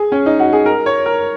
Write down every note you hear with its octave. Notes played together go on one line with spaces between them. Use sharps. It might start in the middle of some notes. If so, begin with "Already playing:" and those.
Already playing: G#4
C#4
D#4
F#4
G#4
A#4
C#5
A#4